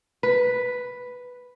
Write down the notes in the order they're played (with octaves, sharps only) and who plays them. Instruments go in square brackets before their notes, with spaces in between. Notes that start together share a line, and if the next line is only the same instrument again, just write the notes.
[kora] B4